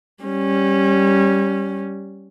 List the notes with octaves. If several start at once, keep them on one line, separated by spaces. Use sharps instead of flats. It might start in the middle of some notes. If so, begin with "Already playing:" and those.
G3 C#4